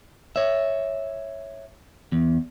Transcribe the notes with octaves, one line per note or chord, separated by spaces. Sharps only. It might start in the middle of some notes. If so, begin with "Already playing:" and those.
C#5 E5
E2